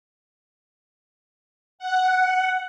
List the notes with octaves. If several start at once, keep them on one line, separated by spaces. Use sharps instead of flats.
F#5